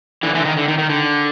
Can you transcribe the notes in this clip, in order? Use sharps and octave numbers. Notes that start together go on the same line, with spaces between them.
D3 E3
D3 E3
D#3
D3
D#3
D#3
D3